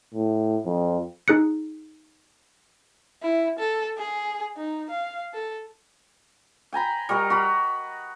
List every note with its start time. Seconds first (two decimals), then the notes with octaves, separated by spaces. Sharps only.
0.14 A2
0.65 F2
1.28 D#4 G#4 F#6 C#7
3.23 E4
3.59 A4
3.98 G#4
4.57 D#4
4.90 F5
5.34 A4
6.73 G5 G#5 A#5 B5
7.09 G3 F#4 A#4 D#5
7.30 F#4 A#5 B5